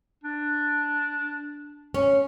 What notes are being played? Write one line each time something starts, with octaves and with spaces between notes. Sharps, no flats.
D4
C#4